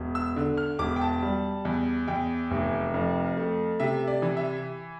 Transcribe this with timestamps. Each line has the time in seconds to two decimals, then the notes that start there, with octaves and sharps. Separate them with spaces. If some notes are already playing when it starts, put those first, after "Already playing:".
Already playing: E1
0.15 E6
0.36 D3
0.57 F6
0.79 E1 D6
0.96 G5
1.01 A5
1.22 G3
1.65 E2
2.08 E2 G5
2.51 F1
2.94 F2
3.37 A3
3.80 C3 E5
4.08 D5
4.22 E3
4.37 E5